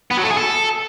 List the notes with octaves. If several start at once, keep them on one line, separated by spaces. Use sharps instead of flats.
B3
F#3
A3
G#4
A4